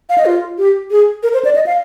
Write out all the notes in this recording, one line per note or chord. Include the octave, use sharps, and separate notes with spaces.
F5
D#5
F4
G4
G#4
A#4
C5
D5
D#5
F5